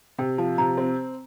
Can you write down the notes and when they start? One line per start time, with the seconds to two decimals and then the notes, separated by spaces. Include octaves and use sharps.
0.18 C3 G5
0.38 F3 A5
0.58 C3 A#5
0.77 C4